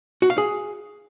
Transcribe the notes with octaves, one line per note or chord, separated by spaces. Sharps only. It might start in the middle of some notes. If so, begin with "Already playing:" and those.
F#4
F5
G#4